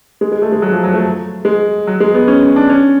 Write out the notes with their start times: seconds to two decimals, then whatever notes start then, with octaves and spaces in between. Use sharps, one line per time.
0.21 G#3
0.32 G#3
0.42 A3
0.52 G#3
0.62 F#3
0.72 F3
0.84 F#3
0.93 A3
1.45 G#3
1.87 F#3
2.00 G#3
2.14 B3
2.28 C#4
2.42 C#4
2.56 D4
2.70 C#4